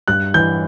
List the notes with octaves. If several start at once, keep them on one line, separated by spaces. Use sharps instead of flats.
G2 F#6
E3 G6